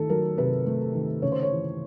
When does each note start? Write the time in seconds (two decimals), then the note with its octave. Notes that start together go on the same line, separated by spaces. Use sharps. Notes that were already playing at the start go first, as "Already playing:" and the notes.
Already playing: D#3 A3 A4
0.09 F#3 A#4
0.38 C3 B4
0.66 A3
0.94 D#3
1.22 C#3 C#5
1.32 C5
1.43 C#5
1.51 E3